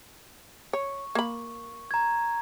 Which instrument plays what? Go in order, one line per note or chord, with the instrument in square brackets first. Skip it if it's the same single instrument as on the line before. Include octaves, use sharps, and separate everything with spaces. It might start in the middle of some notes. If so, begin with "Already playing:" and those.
[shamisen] C#5 [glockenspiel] C#6
[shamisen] A#3 B5
[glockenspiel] A#5 G#6